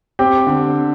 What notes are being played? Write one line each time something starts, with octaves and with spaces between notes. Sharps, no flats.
C4 G4
D3